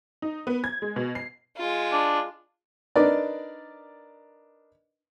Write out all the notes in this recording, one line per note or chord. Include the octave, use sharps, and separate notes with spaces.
D#4
B3
G#6
G#3
B2
C7
G#3 F4
D4
D4 D#4 A#4 B4 D5